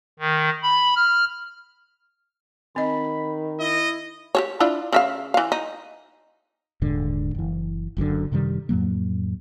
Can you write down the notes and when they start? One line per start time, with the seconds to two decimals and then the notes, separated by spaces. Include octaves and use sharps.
0.19 D#3
0.63 B5
0.96 F6
2.76 D#3 C4 D#5 B5
3.60 E4 D#5
4.35 G4 A4 C#5
4.60 D4 E4 F4
4.93 C#3 E5 F5
5.34 E3 F5
5.52 D#4
6.82 D#1 G#2 D3
7.35 F#1 E3
7.97 F#1 F#2 B2 D3
8.32 F#2 C3 D#3 G3
8.69 F2 A2 F#3 A#3